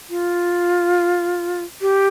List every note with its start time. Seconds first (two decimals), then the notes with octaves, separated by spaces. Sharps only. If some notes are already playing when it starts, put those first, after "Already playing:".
0.10 F4
1.81 G4